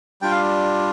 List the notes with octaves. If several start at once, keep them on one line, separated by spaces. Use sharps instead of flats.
G3 D4 F4 G5
F5